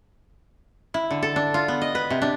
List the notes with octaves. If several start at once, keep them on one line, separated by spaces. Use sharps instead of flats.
E4
D3
A4
D4
F4
B3
D#5
B4
C3
D4